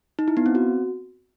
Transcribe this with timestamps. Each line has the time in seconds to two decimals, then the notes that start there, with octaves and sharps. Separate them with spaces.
0.19 D#4
0.28 E4
0.37 B3
0.46 C4
0.55 F#4